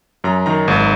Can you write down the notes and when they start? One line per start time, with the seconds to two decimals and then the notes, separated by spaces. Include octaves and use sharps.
0.24 F#2 A#5
0.46 D#3 A#5
0.68 G#1